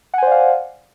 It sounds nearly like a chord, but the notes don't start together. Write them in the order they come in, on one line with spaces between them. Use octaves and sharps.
F#5 G#5 C5 D5 F5